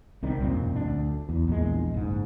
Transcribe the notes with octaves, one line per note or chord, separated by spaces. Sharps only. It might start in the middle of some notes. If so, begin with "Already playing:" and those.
C2 C3 D#3 G3
E1 F#2 A#2 C4
D2 D4
E2
A#1 E2 A#2 G#3
F#1 G#2